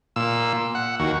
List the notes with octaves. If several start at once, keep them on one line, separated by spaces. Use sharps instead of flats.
A#2 E6
F#5
D#2 F#4